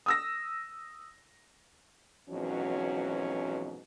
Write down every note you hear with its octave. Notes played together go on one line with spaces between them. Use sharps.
D#6 E6 A#6
F2 G#2 B2 E3 F#3 C#4